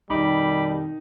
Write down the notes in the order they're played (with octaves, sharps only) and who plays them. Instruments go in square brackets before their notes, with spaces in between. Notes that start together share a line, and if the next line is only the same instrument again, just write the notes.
[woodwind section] F2 B2 D#3 [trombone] G3 [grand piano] D#4 [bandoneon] B5 D6